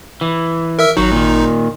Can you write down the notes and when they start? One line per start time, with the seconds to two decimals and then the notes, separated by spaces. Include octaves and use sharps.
0.21 E3
0.79 A#4 E5 E6
0.97 G#1 F#3 D#4
1.12 A#2 D#3